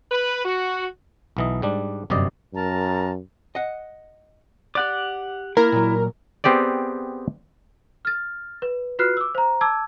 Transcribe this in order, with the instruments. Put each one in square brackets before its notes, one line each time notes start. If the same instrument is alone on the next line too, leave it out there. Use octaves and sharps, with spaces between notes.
[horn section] B4
F#4
[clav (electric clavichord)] B1 E3 D#5
G#2 G3 D4
G1 F#2 C3 D5 D#5
[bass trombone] F#2 [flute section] A#4 A5 A#5
[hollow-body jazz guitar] D#5 F#5
[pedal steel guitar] G4 F#5 D6 [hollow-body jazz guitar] D5
[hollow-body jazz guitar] A#3 [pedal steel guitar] E4 [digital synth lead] A#4
[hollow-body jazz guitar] A#2 F#3
[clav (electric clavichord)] B3 C4 G4 G#4 D5
[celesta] F6 A6
B4
F4 F#4 B4 F6 F#6 C7
D6 E6
C5 A#5
A5 D6 E6 G#6